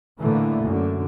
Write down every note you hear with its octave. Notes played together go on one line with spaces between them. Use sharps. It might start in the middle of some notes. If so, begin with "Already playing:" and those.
A2 D3 E3 A3 A#3
F#2 D3